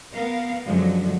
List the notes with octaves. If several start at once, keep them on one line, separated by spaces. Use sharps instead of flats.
B3 A#4 F5
F#2 D3 F3 F#3 G#3